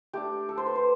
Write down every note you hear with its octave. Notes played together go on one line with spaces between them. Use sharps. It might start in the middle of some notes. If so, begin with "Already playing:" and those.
A3 D4 G4
A4
C5
B4
C5